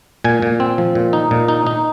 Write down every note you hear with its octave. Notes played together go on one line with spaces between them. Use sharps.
A#2 G#5
A#2
C4
F3
A#2
D#4
A#2
D#4
D#4